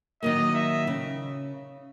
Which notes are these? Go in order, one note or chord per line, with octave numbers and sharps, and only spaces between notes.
D#3 F#3 A#3 D#5
E5
C#3